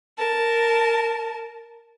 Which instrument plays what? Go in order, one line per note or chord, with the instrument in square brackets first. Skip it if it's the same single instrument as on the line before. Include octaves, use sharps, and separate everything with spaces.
[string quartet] A#4 A5